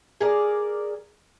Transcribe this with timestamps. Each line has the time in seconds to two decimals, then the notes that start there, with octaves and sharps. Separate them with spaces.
0.21 G#4 A#4 D5